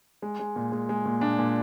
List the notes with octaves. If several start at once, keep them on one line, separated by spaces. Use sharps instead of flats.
G#3
G#3
A#2
G#3
G#3
A#2
A#2 D4
A#2